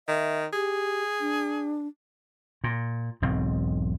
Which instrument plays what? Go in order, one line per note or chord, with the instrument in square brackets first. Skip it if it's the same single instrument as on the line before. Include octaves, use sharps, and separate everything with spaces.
[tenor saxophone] D#3 [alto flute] E5
[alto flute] G4 [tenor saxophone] G#4
[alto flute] D4
[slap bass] A#2
E1 B1 G#2 C4